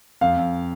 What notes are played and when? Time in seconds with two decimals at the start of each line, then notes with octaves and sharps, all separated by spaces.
0.21 F2 F5
0.37 F2